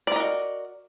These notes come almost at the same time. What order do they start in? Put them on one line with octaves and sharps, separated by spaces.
D5 A#4 D#5 F#4